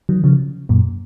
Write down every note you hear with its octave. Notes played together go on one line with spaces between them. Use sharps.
D#3 F#3
C#3 F3
F#2 A#2